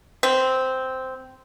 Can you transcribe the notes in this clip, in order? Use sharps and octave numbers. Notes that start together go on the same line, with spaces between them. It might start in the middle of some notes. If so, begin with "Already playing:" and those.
C4